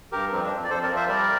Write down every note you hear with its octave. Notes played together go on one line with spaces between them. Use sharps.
G2 G4 A#4
F2 C4
D4
F2
D5
F2 A4 C5
A#4 D5
F3
C5 E5
G3 A#4 D5